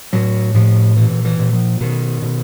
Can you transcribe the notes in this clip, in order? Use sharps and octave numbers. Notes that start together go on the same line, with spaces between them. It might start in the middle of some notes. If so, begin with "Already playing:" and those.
A2 F#3
A2 F3
A#2 E3
E3
A#2
F3
B2 D#3
B2